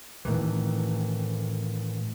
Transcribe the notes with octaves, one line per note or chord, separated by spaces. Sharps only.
A2 D#3 E3